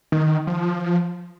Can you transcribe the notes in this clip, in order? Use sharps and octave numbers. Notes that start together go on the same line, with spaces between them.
D#3
F3